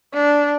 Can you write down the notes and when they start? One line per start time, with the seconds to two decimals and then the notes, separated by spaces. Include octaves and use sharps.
0.14 D4